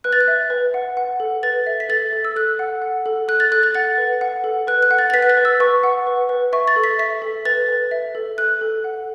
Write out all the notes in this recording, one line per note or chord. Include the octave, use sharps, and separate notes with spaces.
B4 F#6
A6
F#6
E5
B4
F#5
F#5
A4
B4 A6
E5
B6
A4 A6
A4
E6
A4 F#6
F#5
F#5
A4
A4 F#6
A6
A4 F#6
A6
F#5 A6
B4
F#5
A4
B4 F#6
F#6
F#5
A6
A6
B4 B6
F#6
A6
B4
E6
B4 C#6
F#5
B4
B4
E5 C#6
A6
A4
B6
E5 B6
A4
B4 A6
B4
E5
A4
A4 F#6
A4
F#5